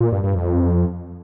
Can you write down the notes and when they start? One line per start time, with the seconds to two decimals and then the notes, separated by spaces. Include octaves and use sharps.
0.01 A#2
0.12 G2
0.24 G2
0.35 F2